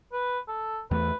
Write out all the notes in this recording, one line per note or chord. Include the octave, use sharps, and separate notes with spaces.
B4
A4
E2 E3 A3 B4